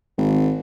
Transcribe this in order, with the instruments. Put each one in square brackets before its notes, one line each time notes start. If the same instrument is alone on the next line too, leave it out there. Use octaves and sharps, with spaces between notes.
[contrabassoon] G#1